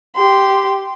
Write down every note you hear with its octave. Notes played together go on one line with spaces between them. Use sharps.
G4 C6